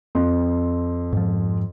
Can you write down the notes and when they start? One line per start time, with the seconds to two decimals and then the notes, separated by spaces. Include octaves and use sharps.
0.15 F2 C6
1.13 G#2 F3